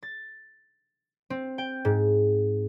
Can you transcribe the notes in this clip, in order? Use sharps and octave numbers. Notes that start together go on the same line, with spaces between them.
A6
C4
G5
G#2